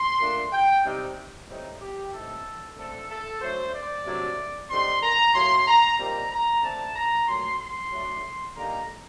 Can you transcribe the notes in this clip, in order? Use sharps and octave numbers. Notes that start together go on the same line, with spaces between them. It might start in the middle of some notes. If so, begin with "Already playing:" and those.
Already playing: C6
A#2 A3 D4
G5
C3 G3 C4 D#4
A2 G3 C4 D#4
G4
A2 A3 C4 D#4 A4
D3 A3 C4 A4
A4
F#3 A3 D4 C5
D5
C3 F#3 A3 D4
D3 G3 C4 D#4 C6
A#5
A2 F#3 A#3 C6
A#5
A#2 G3 C4 D#4 A#5
A#5
D3 A3 C4 A5
A#5
A#2 F#3 A3 C6
C6
F#3 A3 D4
D3 G3 A#3 D#4 A#5